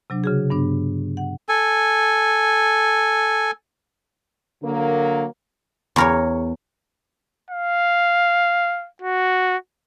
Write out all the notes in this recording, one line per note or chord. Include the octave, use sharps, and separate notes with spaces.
C3 F#3 D4
C#3 F#4 G#4
G2 B3 D4
F#5
A4 G#5
D3 F#3 A#3
E2 A#4 C#5
F5
F#4